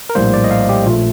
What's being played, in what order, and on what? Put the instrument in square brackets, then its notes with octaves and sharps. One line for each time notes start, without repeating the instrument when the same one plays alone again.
[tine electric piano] A#4
A#1 A2 G3 A#3 C5
D5
D#5
F5
G4
A#1 A#2 F3 A3 F4